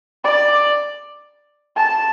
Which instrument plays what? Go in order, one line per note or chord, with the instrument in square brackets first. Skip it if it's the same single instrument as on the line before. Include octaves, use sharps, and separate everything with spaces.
[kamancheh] D5
A5